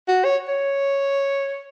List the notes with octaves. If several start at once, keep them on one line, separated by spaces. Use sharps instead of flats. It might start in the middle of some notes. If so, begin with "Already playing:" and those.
F#4
C#5
C#5